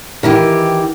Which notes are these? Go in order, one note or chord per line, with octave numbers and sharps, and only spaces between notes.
D#3 E3 G4